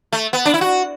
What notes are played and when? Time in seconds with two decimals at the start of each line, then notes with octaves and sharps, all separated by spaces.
0.12 A3
0.33 B3
0.45 D4
0.54 E4
0.61 F#4